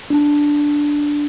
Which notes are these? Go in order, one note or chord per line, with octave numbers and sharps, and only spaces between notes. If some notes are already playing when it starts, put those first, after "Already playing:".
D4